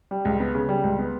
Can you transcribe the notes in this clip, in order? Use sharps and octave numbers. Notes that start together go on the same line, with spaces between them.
G3
C#2
B3
C#3
G3
C#2
B3